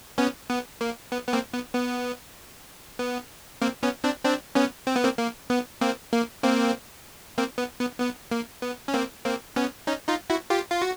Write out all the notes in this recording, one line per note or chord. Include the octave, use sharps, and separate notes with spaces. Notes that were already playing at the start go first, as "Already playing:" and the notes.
B3 C#4
B3
A#3
B3
B3
A#3 C4
B3
B3
B3
A#3 C4
B3 C#4
C4 D4
C4 D4
B3 C#4
C4
B3
A#3 C4
A#3
B3
A#3 C4
A#3
A#3 C4
A#3 C4
B3
B3
B3
A#3
B3
C#4
A#3 C4
A#3 C4
B3 C#4
C#4 D#4
D#4 F4
E4 F#4
F4 G4
F4
F#4